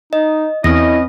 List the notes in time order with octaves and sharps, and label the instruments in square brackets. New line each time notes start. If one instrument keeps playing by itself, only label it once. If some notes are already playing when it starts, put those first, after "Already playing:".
[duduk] D#4 [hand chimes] D#5
[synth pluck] E2 [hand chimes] C4 A#6 [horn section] C#4 B4 D#5 [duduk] E4